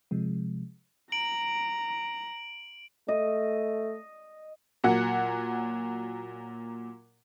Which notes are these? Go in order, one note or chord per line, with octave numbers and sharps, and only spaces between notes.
C3 F3 G#3
A#5 D7 F#7
A3 D#5
A#2 F#3 F#5